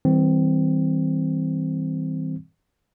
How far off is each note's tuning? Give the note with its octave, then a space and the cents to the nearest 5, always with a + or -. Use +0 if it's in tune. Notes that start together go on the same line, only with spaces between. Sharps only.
E3 -40 G3 +0 C4 -10